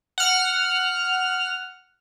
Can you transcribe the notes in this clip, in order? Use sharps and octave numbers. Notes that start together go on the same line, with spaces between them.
F#5 F6